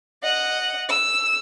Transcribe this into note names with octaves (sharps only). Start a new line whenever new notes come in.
D#5 F#5
E6